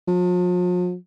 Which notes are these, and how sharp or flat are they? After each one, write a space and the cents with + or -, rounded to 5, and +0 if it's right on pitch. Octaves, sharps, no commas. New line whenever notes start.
F3 +45